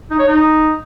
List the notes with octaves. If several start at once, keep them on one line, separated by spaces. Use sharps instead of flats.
D#4
C#5
D#4